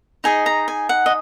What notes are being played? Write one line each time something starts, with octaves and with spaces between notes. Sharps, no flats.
D#4 G#4 D#5 G#5
A#5
G#5
F#5
D#5